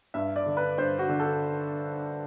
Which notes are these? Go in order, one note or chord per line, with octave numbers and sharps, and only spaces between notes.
G2 E5
D5
D3
B4
G2 C5
F#4
D3
A4